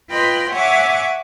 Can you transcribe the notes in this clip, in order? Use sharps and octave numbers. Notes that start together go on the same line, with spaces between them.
F4 B4 D#5 G5 B5 C6
C#5 E5 F#5 G#5 C#6 D6